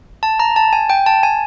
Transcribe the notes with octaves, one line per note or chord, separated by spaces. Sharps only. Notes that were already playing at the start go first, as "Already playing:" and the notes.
A5
A#5
A5
G#5
G5
A5
G#5